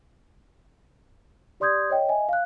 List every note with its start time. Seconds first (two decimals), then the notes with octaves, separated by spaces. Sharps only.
1.60 G4 D5 C6 D#6 G6 G#6
1.90 C#5 D#5 G5
2.09 D#5 E5 G#5
2.29 F5 F#6